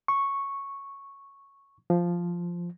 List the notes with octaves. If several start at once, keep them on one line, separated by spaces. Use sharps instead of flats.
C#6
F3